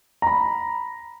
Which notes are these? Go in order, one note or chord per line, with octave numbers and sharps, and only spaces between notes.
A#5 B5